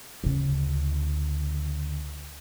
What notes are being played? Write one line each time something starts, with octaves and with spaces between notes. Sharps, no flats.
D2 C#3